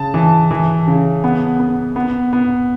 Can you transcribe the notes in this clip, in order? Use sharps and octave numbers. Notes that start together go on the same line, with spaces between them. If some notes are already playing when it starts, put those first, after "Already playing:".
Already playing: C#3 A5
E3
E3
C#3
B3
B3
B3
B3